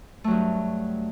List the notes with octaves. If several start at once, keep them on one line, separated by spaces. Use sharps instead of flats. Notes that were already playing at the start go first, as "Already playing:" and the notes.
G2 F#3 A3